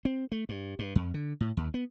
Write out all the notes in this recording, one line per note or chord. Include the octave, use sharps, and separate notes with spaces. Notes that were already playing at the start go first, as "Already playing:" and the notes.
C4
A3
G2
G2
F2
D3
A2
D#2
B3